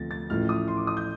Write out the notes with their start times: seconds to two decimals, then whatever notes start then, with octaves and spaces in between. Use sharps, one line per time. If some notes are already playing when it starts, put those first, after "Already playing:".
Already playing: D2 C3 F3 A6 A#6
0.11 A6
0.30 A1 A2 F3 F6
0.49 D#6
0.68 C6
0.77 D6
0.87 D#6
0.97 G6